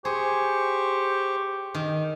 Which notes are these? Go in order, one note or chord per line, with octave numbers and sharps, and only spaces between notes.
G4 G#4 C5 C#6
D#3